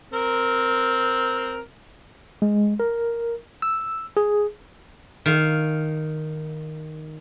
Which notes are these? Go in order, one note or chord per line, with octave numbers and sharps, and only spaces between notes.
C4 A#4
G#3
A#4
E6
G#4
D#3 F5